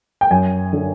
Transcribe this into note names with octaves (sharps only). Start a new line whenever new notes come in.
G5
F#2 G#5
D3